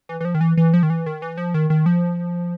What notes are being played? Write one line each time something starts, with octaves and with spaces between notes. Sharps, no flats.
E3
E3
F3
D#3
E3
E3
F3
D#3
E3
D#3
E3
F3
D#3
D#3
F3